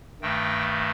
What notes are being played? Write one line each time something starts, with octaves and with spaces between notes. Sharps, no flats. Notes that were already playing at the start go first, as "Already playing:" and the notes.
G2 D#3 A3 G5